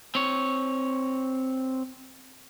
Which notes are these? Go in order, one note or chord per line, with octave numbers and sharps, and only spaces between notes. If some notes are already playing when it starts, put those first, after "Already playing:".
C4 C#5